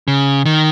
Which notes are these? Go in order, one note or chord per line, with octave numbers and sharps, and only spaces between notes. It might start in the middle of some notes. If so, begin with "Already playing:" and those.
C#3
D#3